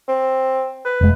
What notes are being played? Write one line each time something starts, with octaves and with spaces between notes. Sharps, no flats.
C4
B4
F1 G#3